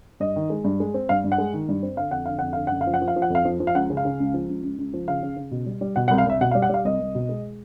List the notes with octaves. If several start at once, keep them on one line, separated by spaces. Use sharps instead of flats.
G2 D#5
D#3
G#3
G2
G#3
C4
G2 F5
G2
F#5
G#3
D#3
G2
C4
D3 F5
F2 F#5
D3 F5
F2 F#5
D3 F5
F#1 F#5
F5
F3
F#5
F3
F5
F3
F#5
F2 F5
F3
F3
F5
C#2 F#5
C#3
F5
C#3
C#2
F3
C#2
C#2
C#2
F3
C#3 F5
C#3
C#3
B2
G3
G3
B2 F#5
F#5
C2
F5
C2 E5
B2 F#5
F5
G3
F#5
G3 F5
C2 D#5
C2
B2
G#3